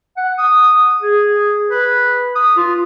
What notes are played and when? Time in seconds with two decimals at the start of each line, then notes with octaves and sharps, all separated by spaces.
0.17 F#5
0.38 D#6
1.02 G#4
1.71 B4
2.35 D#6
2.57 F4